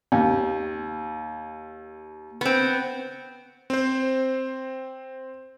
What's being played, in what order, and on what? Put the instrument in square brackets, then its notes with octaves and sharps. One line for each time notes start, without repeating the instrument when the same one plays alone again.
[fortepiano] D#2
[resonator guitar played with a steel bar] B3 C4
[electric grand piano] C4 C5